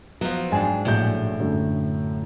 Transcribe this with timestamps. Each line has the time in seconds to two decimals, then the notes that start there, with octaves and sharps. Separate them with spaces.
0.21 F3 F#3 B3
0.52 G#2 D4 G5 G#5
0.85 A#1 A2 F#3 G6
1.40 F#2 D3 A3